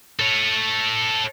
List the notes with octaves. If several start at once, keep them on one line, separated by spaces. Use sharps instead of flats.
A4 C#5